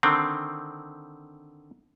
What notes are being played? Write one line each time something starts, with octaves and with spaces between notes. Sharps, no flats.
D3 D#3 C4